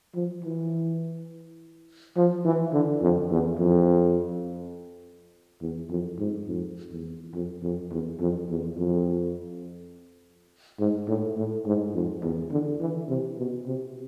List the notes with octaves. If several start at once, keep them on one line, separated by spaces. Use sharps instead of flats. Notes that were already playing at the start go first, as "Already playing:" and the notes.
F3
E3
F3
E3
D3
F2
E2
F2
E2
F2
G#2
F2
E2
F2
F2
E2
F2
E2
F2
G#2
A2
A2
G#2
F2
E2
D3
E3
C3
B2
C3